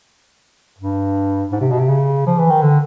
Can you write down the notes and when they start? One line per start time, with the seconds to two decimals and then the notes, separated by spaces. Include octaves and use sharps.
0.79 G2
1.52 G#2
1.61 C3
1.71 B2
1.79 C3
1.89 C#3
2.27 F3
2.39 E3
2.50 D#3
2.62 D3